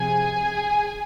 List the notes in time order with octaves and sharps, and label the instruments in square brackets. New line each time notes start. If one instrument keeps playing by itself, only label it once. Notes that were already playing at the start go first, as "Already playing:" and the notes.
Already playing: [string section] C3 F3 G#4 G#5